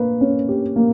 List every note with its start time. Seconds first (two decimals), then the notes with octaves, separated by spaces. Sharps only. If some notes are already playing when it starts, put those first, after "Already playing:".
Already playing: A#3 B4
0.21 C#4
0.49 G4
0.76 A#3